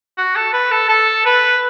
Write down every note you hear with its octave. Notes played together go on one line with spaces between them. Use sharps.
F#4
A4
B4
A4
A4
B4